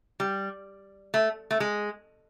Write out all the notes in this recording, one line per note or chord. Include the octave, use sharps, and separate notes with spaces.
G3
A3
A3
G#3